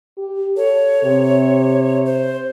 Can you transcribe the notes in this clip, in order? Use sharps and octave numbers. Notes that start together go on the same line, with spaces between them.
G4
A4 C#5
C3
C5